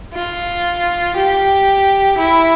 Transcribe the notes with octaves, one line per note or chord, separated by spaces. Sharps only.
F4
G4
E4